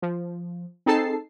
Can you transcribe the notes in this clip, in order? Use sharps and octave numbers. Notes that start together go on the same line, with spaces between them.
F3
C4 D#4 G#4 A4 A5 C7